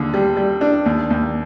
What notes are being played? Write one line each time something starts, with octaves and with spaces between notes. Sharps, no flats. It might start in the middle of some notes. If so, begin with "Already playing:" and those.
Already playing: D#2 D3
G3
G3
D4
D#2
D#2